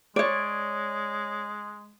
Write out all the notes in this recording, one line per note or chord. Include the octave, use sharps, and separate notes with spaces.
G#3 C#5 D5